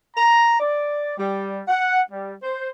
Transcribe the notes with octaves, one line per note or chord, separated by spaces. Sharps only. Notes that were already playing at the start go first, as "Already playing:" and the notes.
A#5
D5
G3
F#5
G3
C5